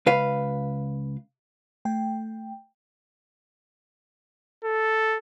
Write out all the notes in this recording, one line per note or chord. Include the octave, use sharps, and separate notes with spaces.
C#2 B4 F5
A3 G5
A4